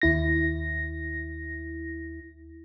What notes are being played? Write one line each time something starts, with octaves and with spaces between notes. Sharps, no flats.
D#2 E4 A#6